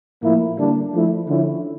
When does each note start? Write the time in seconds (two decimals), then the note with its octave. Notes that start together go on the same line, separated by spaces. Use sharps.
0.22 A2 F3 A#3 E4
0.57 D3 G3 A#3 D4
0.93 F3 A3 E4
1.28 D3 F3 C#4 E4